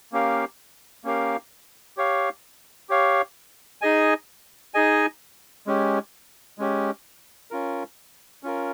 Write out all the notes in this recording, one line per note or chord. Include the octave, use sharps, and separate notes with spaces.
A#3 C#4 G4 A#4 F5
A#3 C#4 G4 A#4 F5
G4 C#5 F5
G4 C#5 F5
D#4 G#4 D#5 G#5
D#4 G#4 D#5 G#5
G#3 C#4 G4
G#3 C#4 G4
C#4 F4 A#4
C#4 F4 A#4